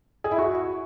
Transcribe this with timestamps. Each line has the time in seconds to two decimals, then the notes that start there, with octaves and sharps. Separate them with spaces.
0.24 G#4
0.31 E4
0.38 F#4